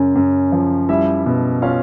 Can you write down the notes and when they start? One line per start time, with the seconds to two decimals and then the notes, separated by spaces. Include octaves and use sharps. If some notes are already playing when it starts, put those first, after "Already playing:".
Already playing: F#2 C#3 C#4
0.15 F#2
0.52 F3
0.89 G3 E4 E5
1.26 B2
1.62 C#4 F4 F5